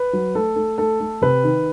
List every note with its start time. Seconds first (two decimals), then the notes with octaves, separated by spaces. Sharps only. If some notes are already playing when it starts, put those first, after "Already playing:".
Already playing: B4
0.13 F#3
0.35 A3 A4
0.56 A3
0.78 A3 A4
1.00 A3
1.22 C3 B4
1.44 D#3